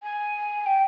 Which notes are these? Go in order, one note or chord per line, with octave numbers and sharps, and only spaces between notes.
G#5
G5